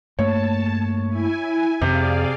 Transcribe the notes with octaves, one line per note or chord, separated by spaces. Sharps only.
G2 A3 A#3 C#5 A5
E4 G#5
F2 C3 G#4 D5 F5